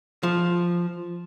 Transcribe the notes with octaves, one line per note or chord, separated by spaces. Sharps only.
F3